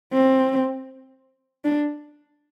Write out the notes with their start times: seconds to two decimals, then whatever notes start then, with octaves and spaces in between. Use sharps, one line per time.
0.13 C4
1.65 D4